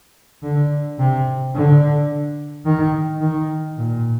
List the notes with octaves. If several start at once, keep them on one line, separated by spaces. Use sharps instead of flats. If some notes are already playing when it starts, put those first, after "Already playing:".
D3
C3
D3
D#3
D#3
A#2